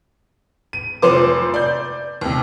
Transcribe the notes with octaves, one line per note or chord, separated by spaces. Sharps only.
D#7
F1 F3 C5 D6
D5 G6
D#2 C3